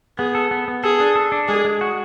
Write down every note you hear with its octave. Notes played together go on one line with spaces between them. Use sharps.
B3 G#4
A4
B3
B3
G#4 A4
D4
A4
D4
G#3 G#4
G#3
F#4